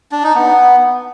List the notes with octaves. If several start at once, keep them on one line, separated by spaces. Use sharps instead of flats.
D4
D#4
B3